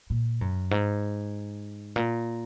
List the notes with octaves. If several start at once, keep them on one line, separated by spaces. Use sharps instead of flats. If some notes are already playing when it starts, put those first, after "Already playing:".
A#2
F#2
G#2
A#2